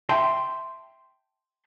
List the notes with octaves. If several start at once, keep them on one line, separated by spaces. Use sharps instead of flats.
E5 G5 A5 C6